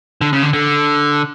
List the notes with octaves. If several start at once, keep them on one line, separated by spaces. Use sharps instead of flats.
D3
C#3
D3
D3